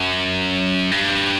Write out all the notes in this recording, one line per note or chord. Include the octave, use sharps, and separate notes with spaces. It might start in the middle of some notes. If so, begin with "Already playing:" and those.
Already playing: F#2
G2